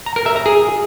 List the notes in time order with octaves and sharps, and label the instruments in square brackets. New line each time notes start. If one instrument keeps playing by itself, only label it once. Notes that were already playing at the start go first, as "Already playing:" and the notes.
[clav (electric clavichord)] A#5
A#4
E5
A#5
G#4